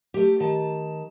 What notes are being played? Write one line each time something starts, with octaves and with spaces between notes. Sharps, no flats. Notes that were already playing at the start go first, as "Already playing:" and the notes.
A3 G4
D#3 A5